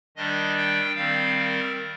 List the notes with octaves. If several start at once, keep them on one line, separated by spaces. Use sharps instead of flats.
D#3 G3 D4 D#5
G5
D#3 G3 C4 F5
A#4